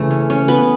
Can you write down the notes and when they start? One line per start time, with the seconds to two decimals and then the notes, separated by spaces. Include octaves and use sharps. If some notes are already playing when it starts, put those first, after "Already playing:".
Already playing: C#3 E3 A3 A4
0.11 C#4
0.30 C#4
0.48 B3 B4